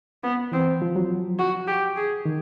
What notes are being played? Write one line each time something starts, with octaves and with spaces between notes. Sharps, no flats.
B3
E3 C4
F3
F#3
F#4
G4
G#4
D#3